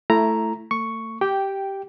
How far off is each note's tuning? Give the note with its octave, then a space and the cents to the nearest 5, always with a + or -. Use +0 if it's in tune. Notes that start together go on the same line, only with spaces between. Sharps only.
A3 +0 E4 +15 A#5 +0
A3 +35 C#6 +0
G4 -10 G5 +0